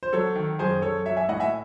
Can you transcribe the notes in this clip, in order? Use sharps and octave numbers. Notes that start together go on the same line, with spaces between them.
C5
F#3 A4 C#5
D#3
F#2 G#4 C5
F#2 A4 C#5
F#3 C#5 E5
E5 G#5
A2 D#5 F#5
E5 G#5